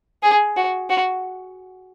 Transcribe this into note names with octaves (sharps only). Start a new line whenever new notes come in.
G#4
F#4
F#4